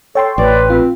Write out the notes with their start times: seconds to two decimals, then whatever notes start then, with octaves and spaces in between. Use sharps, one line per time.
0.15 A4 C#5 G5 C6
0.38 A1 B4 D5
0.70 C4 F4